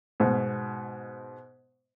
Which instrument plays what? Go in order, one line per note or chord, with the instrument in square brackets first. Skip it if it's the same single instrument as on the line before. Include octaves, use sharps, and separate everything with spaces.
[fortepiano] G#2 B2